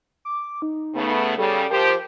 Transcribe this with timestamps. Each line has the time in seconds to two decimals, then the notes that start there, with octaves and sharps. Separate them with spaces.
0.25 D6
0.62 D#4
0.95 C#3 A3 B3
1.38 C#3 G3 A4
1.71 F3 G4 A#4 C5